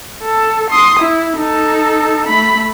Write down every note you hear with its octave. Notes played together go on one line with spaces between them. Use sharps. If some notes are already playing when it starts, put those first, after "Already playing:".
A4
C6 D#6
E4
D#4 A4
A3 B5